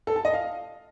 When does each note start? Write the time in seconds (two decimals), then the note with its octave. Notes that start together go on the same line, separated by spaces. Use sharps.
0.07 A4
0.16 A5
0.25 D#5
0.33 F5